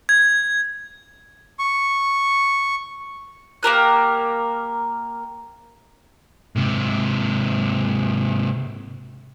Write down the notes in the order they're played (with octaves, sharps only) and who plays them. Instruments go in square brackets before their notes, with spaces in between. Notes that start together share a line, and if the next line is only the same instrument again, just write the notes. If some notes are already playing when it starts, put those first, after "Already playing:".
[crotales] G#6
[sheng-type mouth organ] C#6
[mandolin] A#3 G4 A#4 F#6
[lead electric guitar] G#2 C3